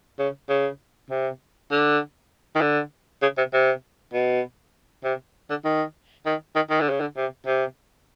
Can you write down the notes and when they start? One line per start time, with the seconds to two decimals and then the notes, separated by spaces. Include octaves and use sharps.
0.19 C#3
0.50 C#3
1.10 C3
1.72 D3
2.55 D#3
2.61 D3
3.22 C#3
3.38 C3
3.53 C3
4.14 B2
5.04 C3
5.50 D3
5.65 D#3
6.26 D#3
6.56 D#3
6.70 D#3
6.81 D3
6.90 C#3
7.01 D3
7.17 C3
7.47 C3